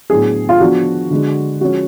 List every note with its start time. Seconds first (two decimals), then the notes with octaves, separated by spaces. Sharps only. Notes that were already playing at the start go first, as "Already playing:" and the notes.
0.10 A2 F#3 B3 D4 G#4
0.49 F4
0.60 F3 B3 D4 F#4
1.10 D3 G#3 D4
1.61 F3 G#3 C#4 F#4